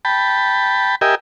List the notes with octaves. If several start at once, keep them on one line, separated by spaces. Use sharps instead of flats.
G5 A5 B5
G4 A#4 D#5 E5 G5 G#5